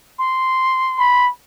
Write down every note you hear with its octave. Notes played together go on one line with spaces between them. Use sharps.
C6
B5